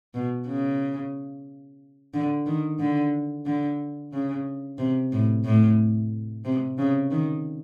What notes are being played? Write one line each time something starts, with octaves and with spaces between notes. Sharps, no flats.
B2
C#3
D3
D#3
D3
D3
C#3
C3
A2
A2
C3
C#3
D#3